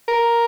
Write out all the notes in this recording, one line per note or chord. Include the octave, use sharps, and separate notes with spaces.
A#4